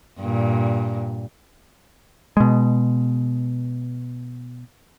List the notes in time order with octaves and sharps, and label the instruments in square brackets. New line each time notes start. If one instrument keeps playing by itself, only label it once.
[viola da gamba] G2 A#2
[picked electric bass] B2 G#3